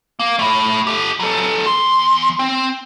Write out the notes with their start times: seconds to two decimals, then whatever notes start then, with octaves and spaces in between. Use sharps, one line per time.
0.20 A#3
0.39 A3 E4
0.87 G4 A4
1.20 F#3 A4
1.66 E2 C6
2.39 C4